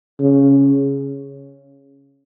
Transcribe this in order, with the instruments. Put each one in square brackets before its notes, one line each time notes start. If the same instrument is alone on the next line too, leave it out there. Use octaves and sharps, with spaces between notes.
[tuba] C#3